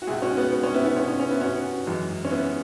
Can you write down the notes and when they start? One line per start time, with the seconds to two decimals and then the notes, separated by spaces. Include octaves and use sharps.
0.02 F#4
0.07 C#2 B2 G#3 E4 G#4
0.22 C#4 F#4
0.37 B3
0.52 B3
0.63 C#4
0.74 B3 E4
0.86 B3 E4
0.96 C#4
1.08 C#4
1.20 C#4
1.30 B3 E4
1.41 C#4 F#4
1.87 F#2 E3 G#3
2.25 C#4
2.31 B3 E4